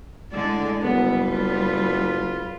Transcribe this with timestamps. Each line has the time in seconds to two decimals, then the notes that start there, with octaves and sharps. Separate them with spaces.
0.33 A2 D3 G#3 D5
0.82 F#1 G3 B3 B4
1.30 F4